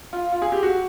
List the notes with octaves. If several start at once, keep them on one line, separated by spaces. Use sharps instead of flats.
F4
F4
G#4
G4
F#4